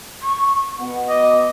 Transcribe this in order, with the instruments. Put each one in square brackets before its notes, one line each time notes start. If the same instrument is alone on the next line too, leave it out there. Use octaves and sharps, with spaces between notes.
[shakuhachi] C#6
[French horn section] B2 B3 [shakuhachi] F#5
[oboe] D#5 [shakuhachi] D6